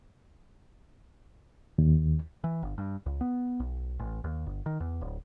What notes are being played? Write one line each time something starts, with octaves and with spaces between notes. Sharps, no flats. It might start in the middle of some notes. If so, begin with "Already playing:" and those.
D#2
E3
G1
G2
C#2
B3
B1
A1
D#2
G1
D#3
E2
D1